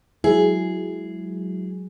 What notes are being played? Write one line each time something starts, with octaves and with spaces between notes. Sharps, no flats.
F#3 G#3 E4 G#4